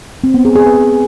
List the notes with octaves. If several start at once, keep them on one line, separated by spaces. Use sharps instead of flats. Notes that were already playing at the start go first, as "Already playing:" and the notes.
C4
B3
G#4
G#4
B4